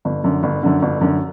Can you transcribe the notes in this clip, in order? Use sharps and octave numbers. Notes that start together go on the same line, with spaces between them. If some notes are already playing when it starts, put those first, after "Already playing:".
G1
F#2 D3
G1
F#2 D3
G1
F#2 D3